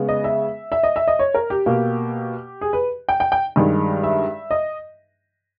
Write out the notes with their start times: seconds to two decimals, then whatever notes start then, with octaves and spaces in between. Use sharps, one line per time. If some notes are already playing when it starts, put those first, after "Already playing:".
Already playing: C#3 G#3 B3
0.09 D#5
0.24 E5
0.72 E5
0.83 D#5
0.96 E5
1.07 D#5
1.19 C#5
1.34 A#4
1.50 G4
1.66 B2 A#3
2.61 G#4
2.73 B4
3.09 G5
3.20 G5
3.32 G5
3.56 G2 D#3 G#3
4.04 E5
4.51 D#5